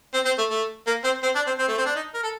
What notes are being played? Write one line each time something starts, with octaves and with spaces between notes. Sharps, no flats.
C4
C4
A3
A3
A#3
C4
C4
D4
C4
C4
A3
C4
D4
D#4
A#4
A4